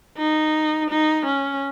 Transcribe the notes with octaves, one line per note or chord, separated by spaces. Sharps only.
D#4
D#4
C#4